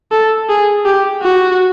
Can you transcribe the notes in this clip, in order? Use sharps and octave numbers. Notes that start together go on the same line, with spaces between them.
A4
G#4
G4
F#4